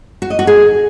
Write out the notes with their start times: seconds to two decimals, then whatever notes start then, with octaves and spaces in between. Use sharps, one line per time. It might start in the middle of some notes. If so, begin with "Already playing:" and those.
0.22 F#4
0.30 D#5
0.39 F#4
0.47 G#4